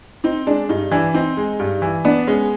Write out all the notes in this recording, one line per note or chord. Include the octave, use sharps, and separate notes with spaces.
C4 D#4
G#3 D4
G2 D#4
E3 D4
C4 D#4
G#3
G2
E3
B3 D4
G#3 C#4